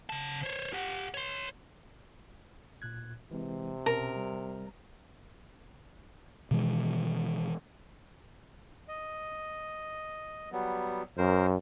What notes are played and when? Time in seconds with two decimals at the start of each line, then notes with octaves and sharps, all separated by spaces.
0.10 C#3 A5
0.44 C5 C#5
0.73 G4 F#5
1.14 C#5 C6
2.82 A#2 F#6 G#6
3.31 C3 E3 G#3 C4
3.86 B2 C#4 A#4
4.16 G3
6.51 B2 D#3 E3 G#3
8.88 D#5
10.52 F#3 G3 B3
11.18 F#2 A#4 C5